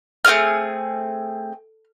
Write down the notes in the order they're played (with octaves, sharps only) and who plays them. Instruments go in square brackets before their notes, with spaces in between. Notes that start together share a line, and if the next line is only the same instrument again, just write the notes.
[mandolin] A3 C4 F4 G#4 F6